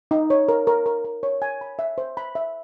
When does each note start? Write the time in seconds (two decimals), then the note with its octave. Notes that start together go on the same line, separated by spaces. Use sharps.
0.11 D#4
0.30 C#5
0.49 A#4
0.67 A#4
0.86 A#4
1.04 A#4
1.23 C#5
1.42 G#5
1.61 B5
1.79 E5
1.98 C5
2.17 B5
2.35 E5